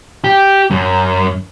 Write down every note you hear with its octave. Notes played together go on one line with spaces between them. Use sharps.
G4
F#2